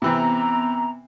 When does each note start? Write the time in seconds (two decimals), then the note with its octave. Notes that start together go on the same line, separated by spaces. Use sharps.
0.02 C3 E3 B3 C4 A#5